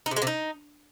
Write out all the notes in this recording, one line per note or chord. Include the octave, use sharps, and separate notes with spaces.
D#4
C3
G#3
C3
D#4